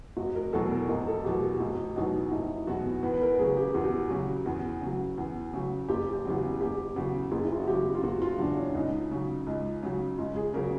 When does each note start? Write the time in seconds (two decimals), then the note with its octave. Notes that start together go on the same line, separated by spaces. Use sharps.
0.17 F1 F#4
0.35 A#4
0.53 E2 B2 F#3 A4
0.71 A#4
0.89 F1 A#4
1.07 A4
1.25 E2 B2 F#3 G4
1.43 G4
1.60 F1 F#4
1.96 E2 B2 F#3 D#4
2.32 F1 E4
2.67 E2 B2 F#3 F#4
3.03 E2 B4
3.14 B4
3.22 A#4
3.39 C#3 F#3 G#4
3.57 G4
3.74 E2 F#4
3.84 G4
3.93 F#4
4.10 C#3 F#3 F#4
4.46 E2
4.81 C#3
4.87 F#3
5.18 E2
5.53 C#3 F#3
5.89 F#1 G4
6.13 G4
6.25 E2 C#3 F#3
6.37 G4
6.61 F#1 G4
6.96 E2 C#3 F#3
7.32 F#1 G#4
7.44 E4
7.52 F4
7.60 F#4
7.67 E2 C#3 F#3 G4
7.95 F4
8.03 F#1 F#4
8.22 F4
8.39 E2 C#3 F#3 D4
8.57 C#4
8.75 C#2 D#4
9.11 C#3 F#3
9.47 C#2
9.83 C#3 F#3
10.18 C#2 F4
10.36 G#4
10.54 C#3 F#3 A#4